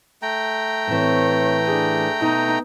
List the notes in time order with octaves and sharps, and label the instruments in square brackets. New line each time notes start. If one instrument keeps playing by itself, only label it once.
[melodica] A3 G5 A#5
[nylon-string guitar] A2 E3 [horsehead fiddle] C4 C#5
[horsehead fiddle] D4 G#4
[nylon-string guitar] B2 [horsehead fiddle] D#4